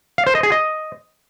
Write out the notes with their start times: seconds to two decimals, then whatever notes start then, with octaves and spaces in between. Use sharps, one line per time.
0.18 F5
0.27 C5
0.35 D#5
0.43 G#4
0.52 D#5